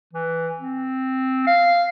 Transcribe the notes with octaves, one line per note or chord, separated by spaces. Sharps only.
E3
C4
F5